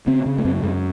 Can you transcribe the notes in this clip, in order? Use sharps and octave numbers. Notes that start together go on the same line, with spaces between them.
C#3 C4
C#3
A3
F#2 C4
F#2 G#3